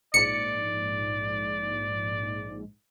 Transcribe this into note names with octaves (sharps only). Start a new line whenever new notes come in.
A#1 G#2 D5 C#7